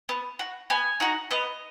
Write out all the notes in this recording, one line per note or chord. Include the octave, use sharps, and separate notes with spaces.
B3
F#4
B3 G#5
D#4 F#4 F#5
B3 D#5